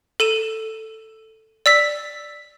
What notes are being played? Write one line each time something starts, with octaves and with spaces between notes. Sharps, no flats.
A4 D#7 E7
D5 E6 B6